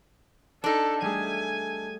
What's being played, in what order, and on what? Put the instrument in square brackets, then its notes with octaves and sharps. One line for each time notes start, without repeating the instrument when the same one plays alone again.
[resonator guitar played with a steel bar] D4 D#4 [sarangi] A4
[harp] G3 A3 G#4 [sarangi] G#5